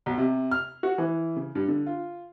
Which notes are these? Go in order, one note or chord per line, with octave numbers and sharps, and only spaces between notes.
B1
C3
F6
F#4
E3
C#3
G2
D3
F4